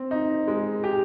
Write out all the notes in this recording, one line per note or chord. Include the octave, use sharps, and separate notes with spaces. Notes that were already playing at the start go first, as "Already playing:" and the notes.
Already playing: C4
D#4
G#3
G4